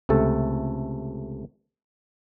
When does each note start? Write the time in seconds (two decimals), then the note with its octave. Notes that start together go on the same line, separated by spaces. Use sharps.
0.09 C#2 C3 A3 A4